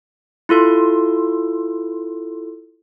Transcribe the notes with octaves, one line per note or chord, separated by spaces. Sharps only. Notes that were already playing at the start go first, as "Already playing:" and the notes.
E4 F4 A4 C6